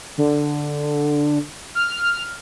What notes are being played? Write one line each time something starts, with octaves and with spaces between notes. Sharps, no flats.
D3
F6